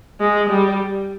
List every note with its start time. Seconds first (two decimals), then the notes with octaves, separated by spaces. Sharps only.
0.20 G#3
0.49 G3